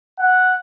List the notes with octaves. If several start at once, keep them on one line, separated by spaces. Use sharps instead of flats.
F#5